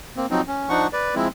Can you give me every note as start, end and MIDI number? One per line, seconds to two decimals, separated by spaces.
0.17 0.26 58
0.17 0.26 60
0.30 0.41 53
0.30 0.41 54
0.30 0.41 60
0.30 0.41 63
0.48 0.69 61
0.69 0.87 53
0.69 0.87 62
0.69 0.87 63
0.69 0.87 78
0.69 0.87 85
0.93 1.15 71
0.93 1.15 74
1.15 1.28 53
1.15 1.28 56
1.15 1.28 60
1.15 1.28 64